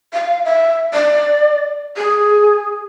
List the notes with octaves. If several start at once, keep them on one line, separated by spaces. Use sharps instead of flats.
F5
E5
D5
G#4